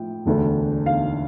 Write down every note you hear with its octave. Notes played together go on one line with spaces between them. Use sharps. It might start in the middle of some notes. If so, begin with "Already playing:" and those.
Already playing: A2 F3 G5
E1 D2 D3
F5